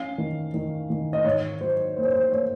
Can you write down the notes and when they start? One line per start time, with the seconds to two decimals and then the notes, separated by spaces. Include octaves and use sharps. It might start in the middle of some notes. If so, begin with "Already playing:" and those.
Already playing: C#4 F5
0.18 D#3
0.54 D#3
0.90 D#3
1.13 D#5
1.25 G#2 C#5
1.61 F#3 C5
1.96 A#3 C5
2.04 C#5
2.12 C5
2.32 A#3 C#5